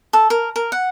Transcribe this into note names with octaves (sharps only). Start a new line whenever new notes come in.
A4
A#4
A#4
F#5